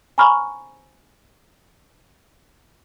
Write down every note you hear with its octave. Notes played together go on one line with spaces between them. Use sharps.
G#5 A#5 B5 C#6 F6